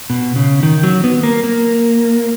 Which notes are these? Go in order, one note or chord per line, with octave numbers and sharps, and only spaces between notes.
B2
C#3
D#3
F#3
B3
A#3
A#3